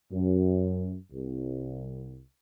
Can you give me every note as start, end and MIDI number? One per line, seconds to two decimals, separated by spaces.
0.11 0.95 42
1.11 2.20 36